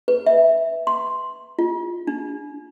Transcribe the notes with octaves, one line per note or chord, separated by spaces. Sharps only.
B4
E5
C6
F4
D4